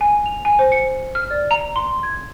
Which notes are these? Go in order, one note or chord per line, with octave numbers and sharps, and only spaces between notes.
G#5
F7
G#5
C5
C#7
F6
D5
A#5
C6
G#6